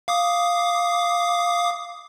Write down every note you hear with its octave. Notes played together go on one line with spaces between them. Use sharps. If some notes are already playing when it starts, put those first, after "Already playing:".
F5 D6 D#6